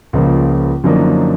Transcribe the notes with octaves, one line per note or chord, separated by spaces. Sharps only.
C#2 C#3 F3 A#3
F#2 D3 F3 A#3 D#4